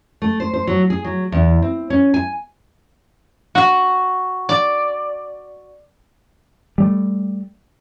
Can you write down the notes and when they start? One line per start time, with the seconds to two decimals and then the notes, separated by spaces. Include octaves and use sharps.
0.22 A3
0.40 C5
0.53 C5
0.67 F#3
0.90 G#4
1.04 F#3
1.32 E2
1.62 C4
1.90 C#4
2.14 G#5
3.55 F#4
4.49 D5
6.78 G3 A3